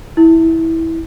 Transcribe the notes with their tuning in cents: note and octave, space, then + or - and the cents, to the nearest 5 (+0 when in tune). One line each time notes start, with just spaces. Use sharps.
E4 -15